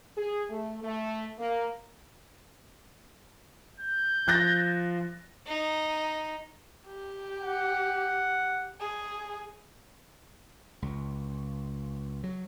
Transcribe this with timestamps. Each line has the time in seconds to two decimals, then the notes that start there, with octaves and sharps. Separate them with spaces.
0.17 G#4
0.49 A3
0.83 A3
1.38 A#3
3.80 G6
4.28 F3 F#6 A6 A#6
5.48 D#4
6.87 G4
7.42 F#5
8.81 G#4
10.82 C#2
12.23 F#3